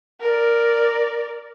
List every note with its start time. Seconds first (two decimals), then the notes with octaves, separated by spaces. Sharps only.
0.20 A#4 D5